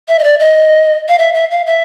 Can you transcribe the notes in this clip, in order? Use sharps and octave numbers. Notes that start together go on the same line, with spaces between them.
E5
D#5
D5
D#5
F5
E5
E5
F5
E5